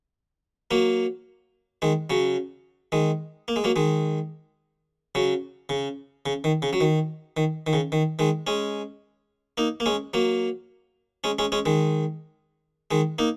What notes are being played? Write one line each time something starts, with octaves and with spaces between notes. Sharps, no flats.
F#3 A#3
D#3 G#3
C#3 F#3
D#3 G#3
A#3
G#3
F#3 A#3
D#3 G#3
C#3 F#3
C#3
C#3
D#3
C#3
F#3
D#3
D#3
D#3
C#3
D#3
D#3 G#3
G#3 C#4
A#3 D#4
A#3
G#3 C#4
F#3 A#3
G#3 C#4
G#3 C#4
G#3 C#4
D#3 G#3
D#3 G#3
A#3 D#4